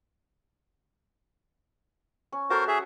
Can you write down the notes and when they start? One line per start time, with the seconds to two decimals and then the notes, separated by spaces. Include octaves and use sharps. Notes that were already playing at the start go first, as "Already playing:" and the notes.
2.32 C#4
2.50 F#4 A4 A#4 C5
2.68 G#4 E5